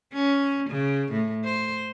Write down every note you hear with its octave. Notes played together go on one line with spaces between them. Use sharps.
C#4
C#3
A2
C5